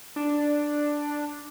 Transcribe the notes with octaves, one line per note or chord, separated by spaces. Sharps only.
D4